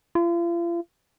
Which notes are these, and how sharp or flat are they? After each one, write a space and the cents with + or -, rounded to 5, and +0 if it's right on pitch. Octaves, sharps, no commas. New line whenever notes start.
F4 -40